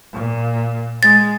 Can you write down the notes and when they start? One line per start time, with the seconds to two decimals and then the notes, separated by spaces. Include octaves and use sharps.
0.13 A#2
1.03 G#3 A6